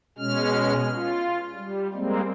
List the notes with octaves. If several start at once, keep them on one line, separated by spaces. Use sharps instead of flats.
B2 G#3 C#4 F6
F4
G3
G3 G#3 A#3 C4